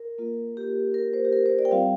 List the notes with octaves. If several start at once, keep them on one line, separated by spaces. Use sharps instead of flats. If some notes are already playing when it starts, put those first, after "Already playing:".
Already playing: A#4
A#3 F4
G4
A#4
C5
G4
A#4
C5
D5
G5
G3 C4 F4 F5